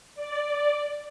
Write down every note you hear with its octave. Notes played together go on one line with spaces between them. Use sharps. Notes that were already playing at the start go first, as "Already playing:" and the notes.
D5